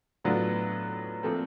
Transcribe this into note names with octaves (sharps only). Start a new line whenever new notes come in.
A2 F#3 B3 D4 F4
A#2 F3 A3 C4